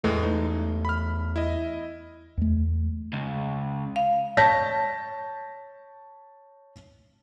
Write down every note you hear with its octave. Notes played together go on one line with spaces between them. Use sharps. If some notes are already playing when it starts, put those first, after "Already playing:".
E2 A2 E3 G#3 A3
D#4
B5 F6
E4 D#5
E2 A3
C#2
F5
C#5 A5 G6 A#6 B6